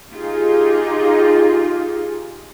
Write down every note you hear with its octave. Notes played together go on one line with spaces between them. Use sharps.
D#4 F4 G4 G#4